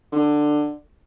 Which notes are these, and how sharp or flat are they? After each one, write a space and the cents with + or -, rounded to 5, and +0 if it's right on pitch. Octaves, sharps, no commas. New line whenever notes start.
D3 +15